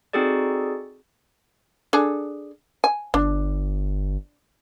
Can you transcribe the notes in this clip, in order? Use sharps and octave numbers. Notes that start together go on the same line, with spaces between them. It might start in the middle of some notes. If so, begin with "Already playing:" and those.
C4 D#4 F#4 G#4 A4 D5
D4 G#4 A4
G#5
G1 D4